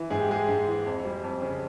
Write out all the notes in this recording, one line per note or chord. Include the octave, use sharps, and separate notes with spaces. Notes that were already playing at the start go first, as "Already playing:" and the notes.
Already playing: E3
G#2 G#4
G4
G#3 G#4
G#2
E3
F2
G3
F2
C#3